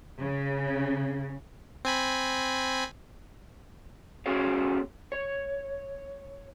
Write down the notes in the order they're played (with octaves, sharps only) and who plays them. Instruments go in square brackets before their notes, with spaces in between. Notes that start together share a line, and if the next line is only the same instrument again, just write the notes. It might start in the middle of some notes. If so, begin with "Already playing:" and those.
[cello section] C#3
[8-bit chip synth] C4 G#5 B5
[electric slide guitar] B3 C#4 F#4 G#4 C#5 F5
C#5